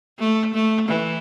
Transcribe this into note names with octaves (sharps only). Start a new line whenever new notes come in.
A3
A3
E3